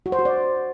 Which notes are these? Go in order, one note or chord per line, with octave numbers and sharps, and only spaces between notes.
F#4
C5
F#4
D5